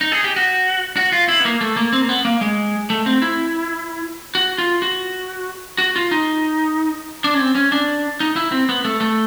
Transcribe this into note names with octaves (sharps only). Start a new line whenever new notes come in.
D#4
G#4
G4
F#4
F#4
F4
E4
B3
A#3
A3
A#3
C4
A#3
B3
A#3
G#3
A3
C4
E4
F#4
F4
F#4
F#4
F4
D#4
D4
C#4
C4
C#4
D4
D#4
E4
C4
B3
A3
A3